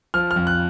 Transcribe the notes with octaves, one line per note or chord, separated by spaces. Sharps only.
F3 F6
F6
F2
F#6